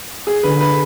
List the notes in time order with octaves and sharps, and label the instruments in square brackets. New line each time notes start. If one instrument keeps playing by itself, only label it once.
[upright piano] G#4
[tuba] D3 [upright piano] B4
[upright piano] B4